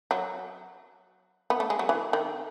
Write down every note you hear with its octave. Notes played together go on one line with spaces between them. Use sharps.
F#3
B3
A3
G#3
F#3
E3
D#3